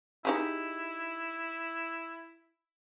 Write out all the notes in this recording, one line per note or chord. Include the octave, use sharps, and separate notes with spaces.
D#4 E4 G4 G#4